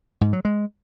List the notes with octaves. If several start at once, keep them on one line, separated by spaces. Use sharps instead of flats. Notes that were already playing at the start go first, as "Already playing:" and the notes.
G#2
F#3
G#3